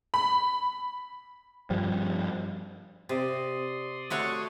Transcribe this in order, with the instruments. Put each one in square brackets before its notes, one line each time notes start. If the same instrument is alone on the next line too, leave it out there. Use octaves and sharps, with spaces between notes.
[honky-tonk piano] B5
[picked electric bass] G2 F3 G3
[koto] C3 [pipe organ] D5 C6 D#6
[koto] A3 F#4 C#5